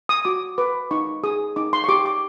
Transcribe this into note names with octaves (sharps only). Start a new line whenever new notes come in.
D#6
F#4 D6
B4 D6
D#4 C#6
G#4 D#6
D#4 D6
C6
C#6
G4 D6
D6